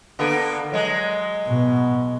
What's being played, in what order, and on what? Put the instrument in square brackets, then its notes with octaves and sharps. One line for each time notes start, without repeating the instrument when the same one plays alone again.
[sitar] D3 A#3 B3
F#3 G#3
[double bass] B2